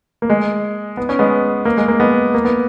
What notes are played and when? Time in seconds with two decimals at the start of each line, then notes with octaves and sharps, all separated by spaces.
0.22 A#3
0.30 G#3
0.97 B3
1.09 C#4
1.19 G#3 B3
1.65 A#3
1.77 G#3
1.88 A#3
2.00 G#3 B3
2.34 A#3
2.45 B3